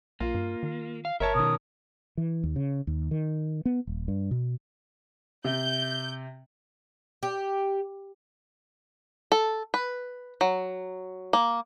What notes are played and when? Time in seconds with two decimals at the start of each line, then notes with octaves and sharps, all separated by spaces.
0.20 B1 A#3 F4
0.34 G2
0.63 D#3
1.05 F5
1.20 G1 A#4 C#5 E5 A5
1.35 B2 D#3 D#6
2.17 E3
2.44 D#2
2.56 C#3
2.87 D#2
3.11 D#3
3.65 B3
3.87 D#1
4.08 G2
4.31 B2
5.45 C3 G6
7.23 G4
9.32 A4
9.74 B4
10.41 F#3
11.33 A#3